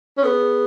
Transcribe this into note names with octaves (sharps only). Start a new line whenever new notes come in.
C#4
B3 G#4 A4